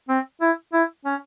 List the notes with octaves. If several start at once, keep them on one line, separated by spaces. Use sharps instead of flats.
C4
E4
E4
C#4